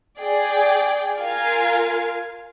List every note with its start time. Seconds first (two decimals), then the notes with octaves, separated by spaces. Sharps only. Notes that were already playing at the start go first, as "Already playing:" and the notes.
0.17 G#4 D5 G5
1.18 F4 A#4 F5 G#5